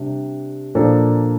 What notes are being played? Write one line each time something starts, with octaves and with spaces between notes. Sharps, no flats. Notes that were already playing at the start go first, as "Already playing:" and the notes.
Already playing: C3 G3 D4 G4
A#2 F3 A#3 D4 A4